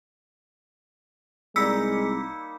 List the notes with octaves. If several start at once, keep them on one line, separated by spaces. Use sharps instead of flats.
C2 G3 G#3 A#3 D#4 E6 B6 C#7